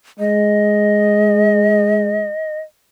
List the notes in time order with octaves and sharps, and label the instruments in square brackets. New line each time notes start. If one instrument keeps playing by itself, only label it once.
[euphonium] G#3 [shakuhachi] D#5